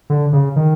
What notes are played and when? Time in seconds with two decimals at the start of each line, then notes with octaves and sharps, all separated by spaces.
0.10 D3
0.33 C#3
0.56 D#3